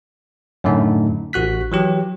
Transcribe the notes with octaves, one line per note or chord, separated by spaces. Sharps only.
F#2 A2 D3 A3 D#4
A1 F#4 F#6 B6
E3 F#3 G4